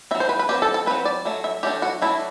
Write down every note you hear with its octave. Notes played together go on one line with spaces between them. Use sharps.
C4 E5
F#3
C5
B4
B4
F#3 C4 G4
A4
A4
F#3 C4 B4
D5
F#3 A3
E5
F#3 A3 D4 G4
F#4
F#3 A3 D4 E4